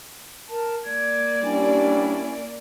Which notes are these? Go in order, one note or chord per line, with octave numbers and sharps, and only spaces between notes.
A#4 A5
A#3 D5 G#6
G3 C#4 D4 E4 G#5